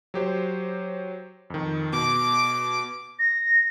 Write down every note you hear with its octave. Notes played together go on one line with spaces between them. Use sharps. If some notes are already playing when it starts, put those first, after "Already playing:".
F#3 G4 C5
F2 D#3
B2 D6
A#6